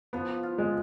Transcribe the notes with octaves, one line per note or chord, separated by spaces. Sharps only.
F3 B3
F4
G#3